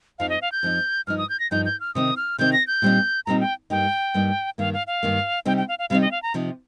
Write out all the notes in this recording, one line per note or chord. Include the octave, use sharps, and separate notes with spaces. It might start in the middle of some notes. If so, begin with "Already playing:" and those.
F2 F3 D#4 F5
D#5
F5
G6
F2 F3 D#4
G2 F3 D#4 F6
D#6
G6
A#6
G2 F3 D#4 G6
G6
F6
C3 D#3 C4 D#4 D#6
F6
C3 D#3 C4 D#4 G6
A#6
G6
A#2 G3 C4 D#4
A#2 G3 C4 D#4 A#5
G5
G2 G3 A#3 D#4 G5
G2 G3 A#3 D#4
G2 D#3 A#3 F5
F5
F5
G2 D#3 A#3
C3 G3 C4 D#4 G5
G5
F5
F5
C3 G3 C4 D#4 F5
D#5
F5
A#5
C3 F3 D#4